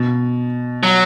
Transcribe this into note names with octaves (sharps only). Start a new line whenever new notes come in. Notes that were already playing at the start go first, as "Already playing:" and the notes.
Already playing: B2
F#3